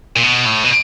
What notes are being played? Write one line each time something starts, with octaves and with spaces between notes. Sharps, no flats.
A#2
B2
A2
B2